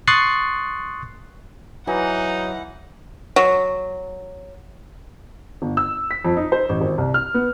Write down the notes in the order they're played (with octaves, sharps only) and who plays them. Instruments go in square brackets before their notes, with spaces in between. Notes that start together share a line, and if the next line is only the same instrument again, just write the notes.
[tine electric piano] C6 C#6 D#6 F#6 A6 C7
[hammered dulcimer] E3 [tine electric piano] F#3 [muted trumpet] D#4 [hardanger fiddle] F#5
[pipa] F#3
[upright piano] G1
E6
B6
F2
D#4
C5
A1
G#1
C2
F6
B3